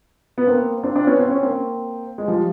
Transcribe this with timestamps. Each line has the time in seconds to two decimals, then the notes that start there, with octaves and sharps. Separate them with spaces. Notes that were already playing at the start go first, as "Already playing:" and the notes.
0.38 B3
0.47 A#3 C4
0.83 C4 D4
0.96 C4 D4
1.07 B3 C#4
1.20 C4
1.31 C#4
1.43 A#3 C4
2.18 G#3
2.28 F3 G3